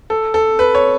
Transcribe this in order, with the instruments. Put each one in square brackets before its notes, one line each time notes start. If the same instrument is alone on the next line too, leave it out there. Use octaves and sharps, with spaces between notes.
[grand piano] A4
A4
B4
C#5